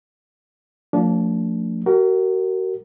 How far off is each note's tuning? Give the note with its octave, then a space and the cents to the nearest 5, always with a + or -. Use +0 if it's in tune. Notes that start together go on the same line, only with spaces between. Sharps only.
F3 +20 A3 +40 D4 -25
F#4 +35 A#4 -15